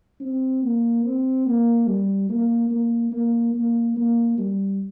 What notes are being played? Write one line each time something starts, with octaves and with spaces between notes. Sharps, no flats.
C4
A#3
C4
A#3
G3
A#3
A#3
A#3
A#3
A#3
G3